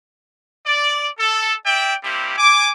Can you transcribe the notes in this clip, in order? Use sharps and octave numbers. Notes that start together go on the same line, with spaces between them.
D5
A4
D5 E5 G5
G3 A#3 C4 E4 G4
G#5 D6